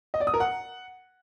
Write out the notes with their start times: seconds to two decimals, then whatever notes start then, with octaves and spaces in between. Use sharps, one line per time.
0.14 D#5
0.20 D5
0.27 D#6
0.34 A#4
0.40 F#5